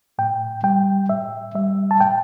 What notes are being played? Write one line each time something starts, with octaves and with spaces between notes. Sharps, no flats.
A2 G5
G3 G5
A2 E5
G3 E5
A5
A2 G5